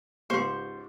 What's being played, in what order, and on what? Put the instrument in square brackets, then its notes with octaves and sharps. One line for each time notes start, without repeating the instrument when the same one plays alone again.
[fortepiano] C#2 G#2 [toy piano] G4 F5 C6 [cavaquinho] C5 C#6